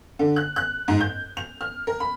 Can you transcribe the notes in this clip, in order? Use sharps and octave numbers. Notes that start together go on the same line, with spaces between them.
D3
F#6
F#6
G#2
G6
F7
F6
A#4
B5